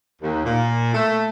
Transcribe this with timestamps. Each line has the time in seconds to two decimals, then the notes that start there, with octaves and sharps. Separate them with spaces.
0.22 D#2
0.45 A#2
0.94 A3